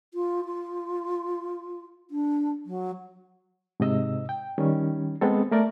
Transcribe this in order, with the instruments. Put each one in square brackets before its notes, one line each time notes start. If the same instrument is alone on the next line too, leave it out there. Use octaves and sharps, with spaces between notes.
[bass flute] F4
F4
D4
F#3
[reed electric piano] G#2 C3 D#5 E6
G5
D#3 G3 C#4
G#3 B3 C4 A4
A3 A#4 D5